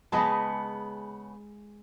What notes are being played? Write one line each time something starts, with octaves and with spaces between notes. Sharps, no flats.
C#3 G#3 B3 B4 D#5 A5